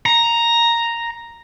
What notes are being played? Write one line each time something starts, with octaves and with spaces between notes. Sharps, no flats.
A#5